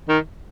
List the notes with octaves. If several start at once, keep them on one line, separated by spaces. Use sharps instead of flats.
D#3